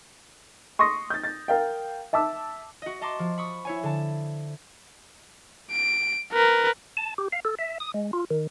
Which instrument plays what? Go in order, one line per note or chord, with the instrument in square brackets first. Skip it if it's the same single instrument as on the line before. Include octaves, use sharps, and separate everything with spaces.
[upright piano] C6 C#6 D#6 A#6
G6 A6
A6
A#4 F5 G5
E5 A5 D6 E6
[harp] F#4 D#5
D#5 A5 A#5 C6 D6
F3
B5 C#6 D#6
E4 C#5 G#5
D3 A5
[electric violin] D7
A#4 B4
[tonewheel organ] A5
G4
F5
A4
E5
D#6
G#3
F4
D#3